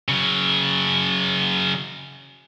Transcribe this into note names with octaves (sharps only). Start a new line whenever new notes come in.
C#3 F#3